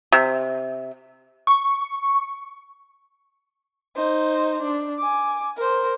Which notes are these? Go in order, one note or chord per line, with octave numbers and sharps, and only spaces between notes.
C3
C#6
D#4 C5
D4
G#5 D6
A#4 C5